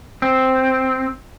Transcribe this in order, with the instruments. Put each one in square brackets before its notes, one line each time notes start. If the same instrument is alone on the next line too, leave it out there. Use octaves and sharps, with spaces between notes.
[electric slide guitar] C4